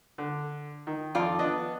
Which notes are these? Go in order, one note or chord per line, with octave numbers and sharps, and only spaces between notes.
D3
D#3
F2 F4 D5
B3 D4 D#5